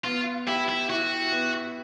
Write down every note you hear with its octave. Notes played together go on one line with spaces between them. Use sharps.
B3 F4
E4 G4
E4
E4 F#4
B3